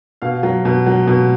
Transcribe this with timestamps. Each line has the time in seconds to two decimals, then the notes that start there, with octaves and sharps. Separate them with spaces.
0.22 B2 F5
0.43 F#3
0.65 B2
0.86 F#3
1.07 B2